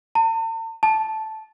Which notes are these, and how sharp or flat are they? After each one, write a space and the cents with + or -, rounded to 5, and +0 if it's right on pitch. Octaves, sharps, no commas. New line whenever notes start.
A5 +45
A5 -5